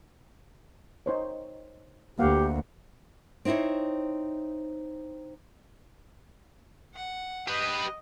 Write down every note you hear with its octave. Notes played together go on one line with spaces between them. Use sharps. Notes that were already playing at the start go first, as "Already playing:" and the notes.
D#4 C5 C#5
D2 A#3 G4 F5 F#5
C4 D#4 E4 C5 C#5
F#5
G4 B4 D#5